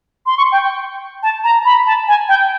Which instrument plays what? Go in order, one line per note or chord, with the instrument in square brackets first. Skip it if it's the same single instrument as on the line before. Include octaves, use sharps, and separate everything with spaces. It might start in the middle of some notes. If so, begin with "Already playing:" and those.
[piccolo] C6
C#6
G5
A5
A#5
B5
A5
G#5
G5